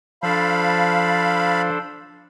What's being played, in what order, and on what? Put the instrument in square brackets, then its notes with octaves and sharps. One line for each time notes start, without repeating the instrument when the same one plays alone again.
[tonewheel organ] F3 [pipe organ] D4 A4 C5 [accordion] F5 B5